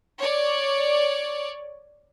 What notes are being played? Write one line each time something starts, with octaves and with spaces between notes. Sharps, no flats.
C#5 D5